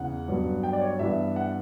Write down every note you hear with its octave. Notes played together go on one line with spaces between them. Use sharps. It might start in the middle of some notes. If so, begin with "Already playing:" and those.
Already playing: E2 C#3 E3 F#5
G2 F#3 B3
G5
D5
C#5
D5
G2 E3 B3 E5
F#5